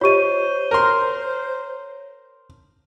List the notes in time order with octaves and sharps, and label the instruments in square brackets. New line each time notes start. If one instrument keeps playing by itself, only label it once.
[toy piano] F4 G4 D#5 [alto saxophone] C5 [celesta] C#5 D#7
[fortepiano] A#4 C6